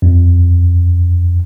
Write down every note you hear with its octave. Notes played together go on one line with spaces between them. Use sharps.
F2